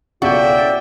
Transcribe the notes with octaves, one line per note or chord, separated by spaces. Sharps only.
B1 A2 C#3 F4 F#4 D5 E5 G5